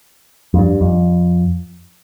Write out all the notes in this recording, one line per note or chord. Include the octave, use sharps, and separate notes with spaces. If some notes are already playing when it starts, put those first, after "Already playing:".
F2
G2
F2